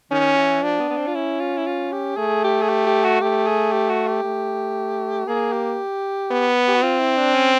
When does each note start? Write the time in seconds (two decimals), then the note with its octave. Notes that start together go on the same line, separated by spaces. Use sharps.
0.11 D#3 C#4
0.37 E3
0.62 F3 D4
0.80 B3
0.90 B3
0.97 C4
1.07 F4
1.15 C#4 E4
1.40 F4
1.57 E4
1.66 F4
1.92 G4
2.17 A3 G#4
2.44 G4
2.62 G#4
2.69 G4
2.86 G4
3.04 F#4
3.21 A3 G4
3.47 G#4
3.72 G4
3.89 F#4
4.07 G4
4.24 A3
5.27 A#3 G#4
5.53 G4
6.31 B3
6.68 G4
6.75 F#4
6.82 C4 F4
6.99 E4
7.17 D4
7.34 C#4